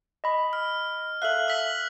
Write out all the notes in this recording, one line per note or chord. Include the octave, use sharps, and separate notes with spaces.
D#5 B5
F6
A4 E5 F5 F#6 F#7
E6 B6 F#7